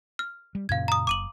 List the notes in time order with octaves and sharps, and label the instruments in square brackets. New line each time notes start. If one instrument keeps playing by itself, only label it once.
[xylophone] F6
[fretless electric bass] G3
[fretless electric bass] F#2 A#2 C#3 [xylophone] F5 G#6
[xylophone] A#5 D#6
[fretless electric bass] F#1 [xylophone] D6 D#7 F#7